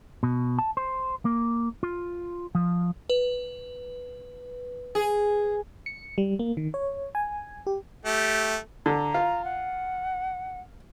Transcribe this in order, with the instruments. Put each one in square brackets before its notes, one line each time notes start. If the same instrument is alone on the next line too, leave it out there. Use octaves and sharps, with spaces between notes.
[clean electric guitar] B2
A5
C5
A#3
F4
F3
[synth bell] B4
[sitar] G#4
[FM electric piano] C#7
G3
A#3
D#3
C#5
G#5
G4
[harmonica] A3 G4
[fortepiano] D3 [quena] A#5
[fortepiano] F4
[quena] F#5